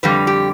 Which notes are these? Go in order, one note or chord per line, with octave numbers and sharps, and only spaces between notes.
F2 D3 G3 B4
G4